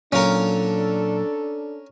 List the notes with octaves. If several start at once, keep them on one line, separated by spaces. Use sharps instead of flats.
A#2 F#3 C#4 D4 A4 A#4 F5